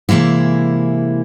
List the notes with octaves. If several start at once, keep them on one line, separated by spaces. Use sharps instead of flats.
C3 E3 G#3 A#3 E4